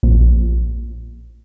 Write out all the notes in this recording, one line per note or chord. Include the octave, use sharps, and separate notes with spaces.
A#1